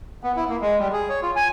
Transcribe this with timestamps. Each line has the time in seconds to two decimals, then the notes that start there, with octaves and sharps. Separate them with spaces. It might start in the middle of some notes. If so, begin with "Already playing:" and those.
0.23 B3
0.37 E4
0.49 A#3
0.61 G#3
0.79 G3
0.93 G#4
1.09 C#5
1.22 F4
1.36 G#5